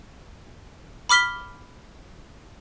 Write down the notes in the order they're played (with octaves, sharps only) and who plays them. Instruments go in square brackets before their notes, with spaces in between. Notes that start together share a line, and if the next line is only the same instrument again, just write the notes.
[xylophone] B5 D6 F6 B6 G7